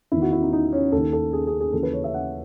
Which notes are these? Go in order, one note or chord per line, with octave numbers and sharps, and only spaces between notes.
E2 D#3 E4
F#4
E4
D#4
D#4
C#4
D#2 D#3 A4
A4
G#4
G#4
G#4
D#2 C#3 E3 A4
B4
C#5
E5
F#5